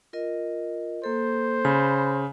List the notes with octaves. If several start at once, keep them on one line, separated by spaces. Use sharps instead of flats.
F4 A#4 D#5
A#3 A4 C5
C#3 B5